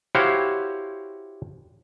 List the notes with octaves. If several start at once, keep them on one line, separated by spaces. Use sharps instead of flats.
E4 F#4 G4 C5 C#5 F5